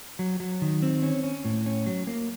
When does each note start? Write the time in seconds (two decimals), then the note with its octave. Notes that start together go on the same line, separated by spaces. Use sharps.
0.19 F#3
0.40 F#3
0.62 D#3
0.82 C4
1.03 C#4
1.24 C#4
1.45 A2
1.66 C#4
1.86 F#3
2.07 A#3